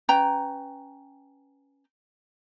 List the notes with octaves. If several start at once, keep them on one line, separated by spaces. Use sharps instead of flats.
C#4 B4 G5 A#5